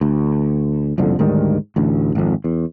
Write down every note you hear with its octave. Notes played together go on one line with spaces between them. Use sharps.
D2
F#1 C2 F2 D3
D2 G#2 D#3 G3
A1 D2
G#1 F2
E2